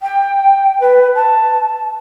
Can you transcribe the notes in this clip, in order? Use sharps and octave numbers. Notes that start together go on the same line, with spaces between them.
G5
B4
A5